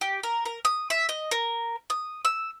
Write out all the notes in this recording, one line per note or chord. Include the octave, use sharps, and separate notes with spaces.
G4
A#4
A#4
D#6
E5
D#5
A#4
D#6
E6